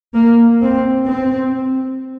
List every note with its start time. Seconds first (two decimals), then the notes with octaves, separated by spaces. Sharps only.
0.15 A#3
0.61 C4
1.07 C4